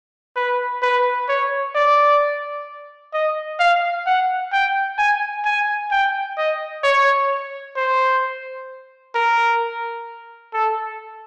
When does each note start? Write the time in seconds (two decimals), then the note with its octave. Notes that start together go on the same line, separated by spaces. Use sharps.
0.36 B4
0.83 B4
1.29 C#5
1.75 D5
3.14 D#5
3.60 F5
4.06 F#5
4.53 G5
4.99 G#5
5.45 G#5
5.91 G5
6.38 D#5
6.84 C#5
7.76 C5
9.15 A#4
10.54 A4